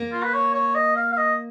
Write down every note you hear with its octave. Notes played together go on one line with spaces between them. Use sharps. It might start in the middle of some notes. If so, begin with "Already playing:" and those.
Already playing: A#3
F4
B4
C#5
C#5
D#5
F5
F5
D#5